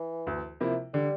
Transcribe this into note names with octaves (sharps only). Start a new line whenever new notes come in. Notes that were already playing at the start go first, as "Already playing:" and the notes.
Already playing: E3
D2
C3 F3 A#3 E4
D3 G3